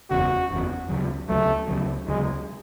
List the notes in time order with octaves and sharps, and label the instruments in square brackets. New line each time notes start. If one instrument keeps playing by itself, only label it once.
[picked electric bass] F#1 E2 C#3 [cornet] F#4
[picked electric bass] F#1 E2 C#3
D2 C#3 F#3
[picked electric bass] D2 C#3 F#3 [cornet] A3
[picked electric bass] D2 C#3 F#3
[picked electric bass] D2 C#3 F#3 [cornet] G#3